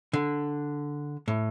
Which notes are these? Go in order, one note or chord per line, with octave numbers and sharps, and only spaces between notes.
D3
A2